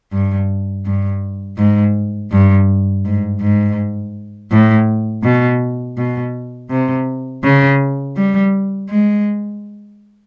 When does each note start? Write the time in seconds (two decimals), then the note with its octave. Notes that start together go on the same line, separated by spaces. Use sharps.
0.12 G2
0.85 G2
1.58 G#2
2.31 G2
3.05 G#2
3.41 G#2
4.51 A2
5.23 B2
5.97 B2
6.70 C3
7.43 C#3
8.16 G3
8.89 G#3